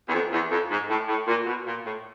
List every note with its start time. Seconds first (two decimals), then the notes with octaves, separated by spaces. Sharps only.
0.09 E2
0.13 F2
0.32 E2
0.51 F2
0.70 G#2
0.89 A2
1.08 A2
1.27 A#2
1.46 B2
1.66 A#2
1.85 A2